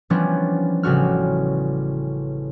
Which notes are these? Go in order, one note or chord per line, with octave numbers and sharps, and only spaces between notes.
E3 F3 G3 B3 C#4 D4
A1 C#3 G3 F#4 F6